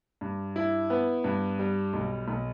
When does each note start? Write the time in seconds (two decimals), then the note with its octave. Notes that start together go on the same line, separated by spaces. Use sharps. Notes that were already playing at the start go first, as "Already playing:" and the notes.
0.21 G2
0.56 E4
0.90 B3
1.24 G2
1.59 G3
1.94 B1
2.28 B1